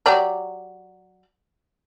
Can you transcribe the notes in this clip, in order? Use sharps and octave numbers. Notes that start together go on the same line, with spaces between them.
F#3 G4 D5